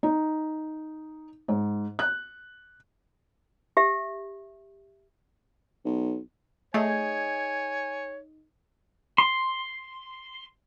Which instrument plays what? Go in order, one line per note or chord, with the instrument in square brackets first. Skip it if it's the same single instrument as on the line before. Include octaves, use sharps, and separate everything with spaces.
[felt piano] D#4
G#2
F#6
[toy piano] G4 E5
[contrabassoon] B1
[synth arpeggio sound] A3 [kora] D#4 G#4 [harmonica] C#5 [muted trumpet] G#5
[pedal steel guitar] C6